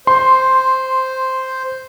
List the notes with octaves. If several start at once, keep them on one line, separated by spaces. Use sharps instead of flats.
C5 C6